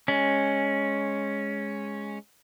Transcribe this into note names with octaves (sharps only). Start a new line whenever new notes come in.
G#3 C#4